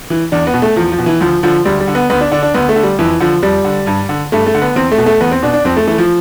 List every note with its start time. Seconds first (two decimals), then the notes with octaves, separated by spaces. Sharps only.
0.10 E3
0.32 E2 D4
0.47 B3
0.54 B2
0.62 A3
0.76 E2 F3
0.92 F3
0.98 B2
1.06 E3
1.21 D2 F3
1.43 D3 F3
1.65 D2 G3
1.80 G3
1.88 D3
1.95 B3
2.10 D2 B3
2.21 D4
2.32 D3 D4
2.43 D4
2.54 D2 B3
2.69 A3
2.76 D3
2.83 G3
2.99 F2 E3
3.20 D3 F3
3.42 F2 G3
3.65 D3
3.87 G2
4.09 D3
4.32 G2 A3
4.46 A3
4.54 D3
4.62 B3
4.76 E2 C4
4.92 A3
4.98 B2
5.06 A3
5.21 E2 B3
5.32 C4
5.42 B2 D4
5.53 D4
5.65 F2 C4
5.77 A3
5.87 E3 A3
5.98 F3